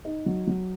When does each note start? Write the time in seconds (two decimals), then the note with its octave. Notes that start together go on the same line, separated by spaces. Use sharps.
0.05 D#4
0.26 F#3
0.47 F#3